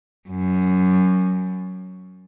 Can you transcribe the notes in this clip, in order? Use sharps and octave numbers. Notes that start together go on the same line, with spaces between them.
F#2